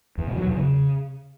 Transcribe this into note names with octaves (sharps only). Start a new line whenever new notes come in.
E2
B2
F#3
E2
C#3